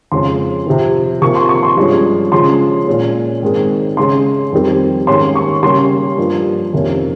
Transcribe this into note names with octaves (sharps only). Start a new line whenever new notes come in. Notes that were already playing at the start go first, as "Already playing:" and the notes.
F2 C#3 F3 G#3 C#4 C6
C3 F3 C4
C3 F3 A#3 C#6
C6
C#6
C6
G2 F3 G#3 C#4
C#3 F3 G#3 C#4 C6
A#2 G#3 C#4
G#2 D#3 G#3 C4
C#3 G#3 C#4 C6
F2 D#3 G3 C4
G#2 D#3 A#3 C#4 C6
C#6
C#3 G3 A#3 C#4 C6
G2 F3 A#3
F2 C3 D#3 A#3 C#4